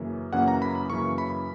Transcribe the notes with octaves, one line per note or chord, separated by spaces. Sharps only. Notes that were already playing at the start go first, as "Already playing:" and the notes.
Already playing: F#2 C#3 E3 A#3 C#4
F#2 C#3 E3 A#3 C#4 F#5
A#5
B5
B5
F#2 C#3 E3 A#3 C#4 C#6
B5